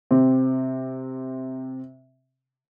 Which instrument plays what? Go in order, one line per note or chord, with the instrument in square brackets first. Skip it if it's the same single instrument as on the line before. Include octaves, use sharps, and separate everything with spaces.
[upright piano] C3 C4